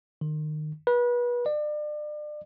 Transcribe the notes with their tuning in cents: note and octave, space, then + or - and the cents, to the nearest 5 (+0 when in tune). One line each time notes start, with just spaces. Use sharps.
D#3 -30
B4 -30
D5 +35